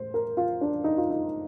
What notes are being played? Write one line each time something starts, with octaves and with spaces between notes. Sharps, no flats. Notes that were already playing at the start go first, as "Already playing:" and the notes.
Already playing: A2 C5
A#4
F4
D4
D#4
F4
D#4